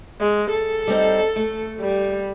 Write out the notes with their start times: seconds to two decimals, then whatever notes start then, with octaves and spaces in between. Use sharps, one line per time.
0.20 G#3
0.51 A4
0.87 G3 C4 D#4
1.36 A3
1.80 G3